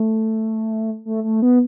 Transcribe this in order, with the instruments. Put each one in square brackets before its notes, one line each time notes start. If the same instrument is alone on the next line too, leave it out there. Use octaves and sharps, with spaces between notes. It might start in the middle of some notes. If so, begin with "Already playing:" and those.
Already playing: [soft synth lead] A3
A3
A3
B3